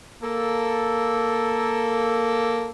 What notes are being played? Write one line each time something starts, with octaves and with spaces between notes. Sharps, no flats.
A#3 A4